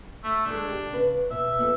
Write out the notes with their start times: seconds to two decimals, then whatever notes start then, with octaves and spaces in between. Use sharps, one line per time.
0.24 A3
0.46 G#3 D4 A4
0.68 G4
0.89 C#3 B4
1.31 B2 E5
1.59 B3 F4 A4